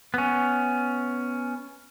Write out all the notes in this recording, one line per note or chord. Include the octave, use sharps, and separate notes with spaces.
B3 C#4